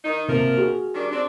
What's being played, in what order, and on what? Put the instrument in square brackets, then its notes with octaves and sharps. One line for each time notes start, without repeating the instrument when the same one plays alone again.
[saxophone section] D#3 D#4
[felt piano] C3 A#3 [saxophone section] F3 A#4
[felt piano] F#4 G#4
[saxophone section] D#3 G3 D4
C4 D4